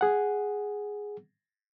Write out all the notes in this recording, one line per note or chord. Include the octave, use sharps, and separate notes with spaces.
G#4 F#5